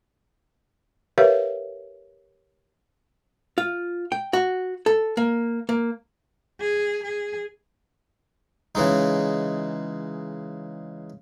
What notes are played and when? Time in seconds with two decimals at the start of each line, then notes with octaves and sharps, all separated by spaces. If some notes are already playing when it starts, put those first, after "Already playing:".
1.18 G4 A#4 B4 C#5 E5 F5
3.58 F4
4.12 G5
4.33 F#4
4.86 A4
5.17 A#3
5.69 A#3
6.60 G#4
7.03 G#4
8.75 C#3 E3 G#3 D#4